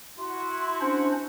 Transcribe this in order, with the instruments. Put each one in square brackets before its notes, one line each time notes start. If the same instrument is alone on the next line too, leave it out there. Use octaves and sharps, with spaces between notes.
[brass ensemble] E4 F#4 [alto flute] C6
[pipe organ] C#4 D4 C5